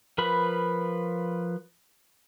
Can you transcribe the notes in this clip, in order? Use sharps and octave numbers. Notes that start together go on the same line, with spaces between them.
F3 A#4 B4 B5